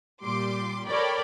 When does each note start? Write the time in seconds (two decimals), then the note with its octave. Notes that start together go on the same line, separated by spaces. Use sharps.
0.23 A#2 G3 C6 D6
0.87 A4 A#4 C#5 D5 G5 B5